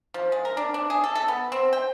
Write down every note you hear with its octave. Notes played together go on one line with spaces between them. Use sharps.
F3
G#3
A#4
D4
D4
G#4
A4
A4
B3
C4
G5